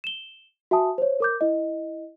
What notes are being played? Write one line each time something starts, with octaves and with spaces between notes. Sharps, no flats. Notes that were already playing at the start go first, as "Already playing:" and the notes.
E7 G7
F#4 E5 G#5 A5 D#6
C5 C#5
A#4 D6 G6
E4 D#5